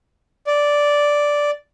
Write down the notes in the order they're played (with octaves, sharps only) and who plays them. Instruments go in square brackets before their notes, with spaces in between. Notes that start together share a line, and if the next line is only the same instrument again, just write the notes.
[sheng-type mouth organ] D5